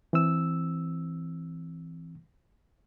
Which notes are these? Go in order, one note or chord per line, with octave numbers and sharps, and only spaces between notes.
E3 C4 E6